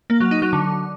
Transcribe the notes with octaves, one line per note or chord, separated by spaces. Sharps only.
A#3
F#3
D#4
F#3
D3